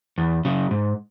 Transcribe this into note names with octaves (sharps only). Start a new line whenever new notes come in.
E2
C#3 F#3
G#2